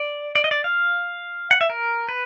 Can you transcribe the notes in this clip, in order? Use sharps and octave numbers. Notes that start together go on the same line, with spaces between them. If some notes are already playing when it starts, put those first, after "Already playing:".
Already playing: D5
D5
D#5
D5
F5
F#5
E5
A#4
B4